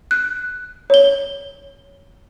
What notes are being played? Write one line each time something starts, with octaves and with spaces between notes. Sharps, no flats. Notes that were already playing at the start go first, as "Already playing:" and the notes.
F#6
C#5 G7